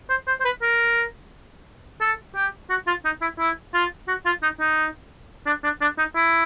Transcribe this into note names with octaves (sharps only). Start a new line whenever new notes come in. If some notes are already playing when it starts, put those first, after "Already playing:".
C5
C5
C5
B4
A#4
A4
G4
F#4
F4
D#4
E4
E4
F4
F#4
F4
D#4
D#4
D4
D4
D4
D#4
E4